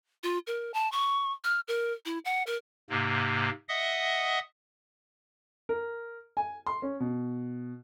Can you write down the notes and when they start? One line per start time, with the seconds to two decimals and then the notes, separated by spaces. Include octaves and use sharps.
0.23 F4
0.47 A#4
0.74 A5
0.92 C#6
1.44 F6
1.68 A#4
2.05 E4
2.25 F#5
2.47 A#4
2.90 G#2 C3 A#3
3.69 D#5 E5 F#5 D#6
5.69 A#4
6.37 G#5
6.67 C6
6.82 C#4
7.00 B2